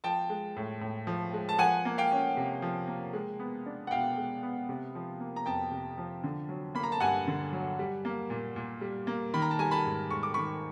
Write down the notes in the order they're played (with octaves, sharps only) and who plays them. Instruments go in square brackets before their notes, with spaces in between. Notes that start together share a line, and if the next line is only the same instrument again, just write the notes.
[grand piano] F3 G5 A5
G#3
A2
A2
F3
G#3
A5
F3 F#5 G#5
A#3
F5 G5
C#4
C3
F3
A#3
G#3
B3
D4
F#5
B2 F5 G5
G#3
B3
C3
F3
A#3
A#5
F2 G5 A5
C3
F3
D3
F#3
A#3 B5
A#5
A5
G2 F#5 G#5
D3
F#3
G3
A#3
A#2
A#2
G3
A#3
D#3 B5
A#5
A5
G3 G#5 A#5
A5 B5
G#2
G#2 C#6
D6
D#3 B5 C#6